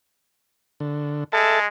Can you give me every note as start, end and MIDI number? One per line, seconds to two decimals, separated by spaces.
0.80 1.24 50
1.33 1.68 56
1.33 1.59 69
1.33 1.59 76
1.33 1.59 81